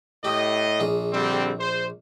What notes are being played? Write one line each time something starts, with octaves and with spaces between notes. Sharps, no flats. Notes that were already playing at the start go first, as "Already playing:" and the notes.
A2 G4 D#5
A#1 G#4
D3 G3 C4
C5